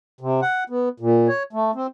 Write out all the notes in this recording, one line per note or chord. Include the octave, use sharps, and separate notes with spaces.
C3
F#5
B3
A#2
C#5
A3
C4